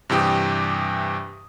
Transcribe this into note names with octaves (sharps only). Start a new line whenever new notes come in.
G2 C3 E3 G4 G5 D#6